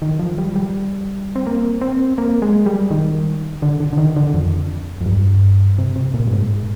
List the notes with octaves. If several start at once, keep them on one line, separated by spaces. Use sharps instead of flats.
D#3
F3
G3
G3
C4
A#3
C4
A#3
G#3
G3
D#3
D3
D3
D3
D#3
D3
F2
F2
G2
C3
C3
A#2
G2
G#2